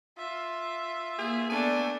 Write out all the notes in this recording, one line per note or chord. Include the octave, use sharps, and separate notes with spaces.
F4 E5
A#3 G#4
A3 B3 D4 A4 G#5